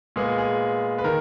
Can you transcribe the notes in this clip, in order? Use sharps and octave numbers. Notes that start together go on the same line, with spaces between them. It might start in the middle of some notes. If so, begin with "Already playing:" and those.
A#2 G#3 B3 G#4
G#4
B4
D#3 A#4